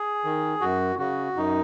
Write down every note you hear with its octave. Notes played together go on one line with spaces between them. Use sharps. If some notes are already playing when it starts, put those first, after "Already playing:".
Already playing: G#4
D#3
F#2 F#4
C#3 F#4
F#2 D#4